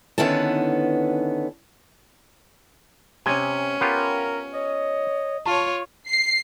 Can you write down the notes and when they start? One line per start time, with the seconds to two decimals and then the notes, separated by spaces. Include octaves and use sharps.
0.18 D3 D#3 B3 C#4 E4 A5
3.26 C3 C#4 G#5
3.81 B3 F4 G4 A#4
4.54 C#5 D#5
5.46 F4 C#5 A5 C#6
6.08 C7